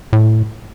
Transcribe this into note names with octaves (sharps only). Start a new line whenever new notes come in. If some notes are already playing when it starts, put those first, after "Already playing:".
A2